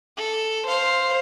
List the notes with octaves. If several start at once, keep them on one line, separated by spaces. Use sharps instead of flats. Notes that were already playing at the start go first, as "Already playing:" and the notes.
A4
C5 F5